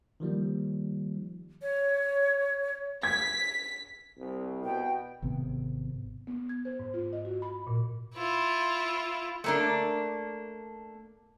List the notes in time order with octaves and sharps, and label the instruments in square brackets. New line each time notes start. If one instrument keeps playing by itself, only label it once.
[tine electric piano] D#3 F3 G3 A#3
[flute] C#5
[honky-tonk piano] G#6 [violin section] B6
[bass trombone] C2
[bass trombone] B2 [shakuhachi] G5
[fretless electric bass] G#1 C3 B3
[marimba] B3
G#6
C5
G#2
F4
D#5
F#4
B5
A#2
[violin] E4 F4
[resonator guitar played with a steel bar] A3 A#3 D4